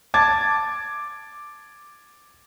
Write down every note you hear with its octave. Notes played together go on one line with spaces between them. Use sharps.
A5 D6 G#6 A6